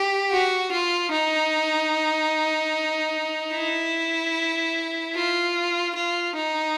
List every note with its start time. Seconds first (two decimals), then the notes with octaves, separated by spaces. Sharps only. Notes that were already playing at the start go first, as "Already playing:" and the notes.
Already playing: G4
0.31 F#4
0.71 F4
1.12 D#4
3.54 E4
5.15 F4
5.95 F4
6.35 D#4